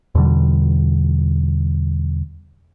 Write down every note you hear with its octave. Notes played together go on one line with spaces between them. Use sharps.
E2 B2 D3 G3